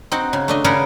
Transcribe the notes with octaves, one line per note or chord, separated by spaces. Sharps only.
C4 D#4 F#4
C#3
A3 D4 D#5
C#3 D4 G#4 A#4 B4 F#5